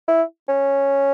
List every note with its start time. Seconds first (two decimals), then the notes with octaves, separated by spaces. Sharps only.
0.08 E4
0.49 C#4